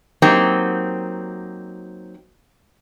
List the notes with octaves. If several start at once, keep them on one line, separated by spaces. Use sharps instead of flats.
F#3 A#3 C4 D#4 G4